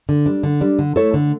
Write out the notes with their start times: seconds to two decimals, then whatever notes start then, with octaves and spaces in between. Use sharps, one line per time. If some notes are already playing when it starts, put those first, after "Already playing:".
0.09 D3
0.26 G3 D4
0.43 D3
0.61 G3 D4
0.79 D3
0.96 A3 E4 A4 C#5
1.14 D3